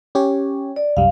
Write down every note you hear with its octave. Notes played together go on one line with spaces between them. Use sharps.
C#4 G4 C#5
D5
C2 F#2 G3 F5